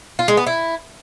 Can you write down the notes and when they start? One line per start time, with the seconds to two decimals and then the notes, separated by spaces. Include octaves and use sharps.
0.19 F4
0.28 G#3
0.37 B3
0.47 E4